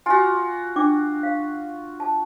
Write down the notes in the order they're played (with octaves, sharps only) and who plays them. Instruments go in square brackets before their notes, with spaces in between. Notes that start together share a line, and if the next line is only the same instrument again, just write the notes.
[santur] F4 F#4 [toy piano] G#5
[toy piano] D4 G5 D6
F5
A5